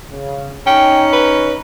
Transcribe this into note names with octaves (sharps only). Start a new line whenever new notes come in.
C#3
C#4 D#4 G5 A#5
B4